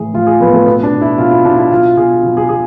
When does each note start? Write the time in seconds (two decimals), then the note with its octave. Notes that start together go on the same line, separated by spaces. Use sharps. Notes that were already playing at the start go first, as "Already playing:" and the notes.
Already playing: A2 E3 G#4
0.14 A2 F4
0.27 G#4
0.40 A2 B3
0.54 A3
0.66 B2 B3
0.83 D4
0.93 B2
1.01 E4
1.18 B2 F4
1.31 E4
1.44 B2 D4
1.58 E4
1.71 B2 F4
1.97 B2 G#4
2.23 B2
2.37 G#4
2.49 B2 G#4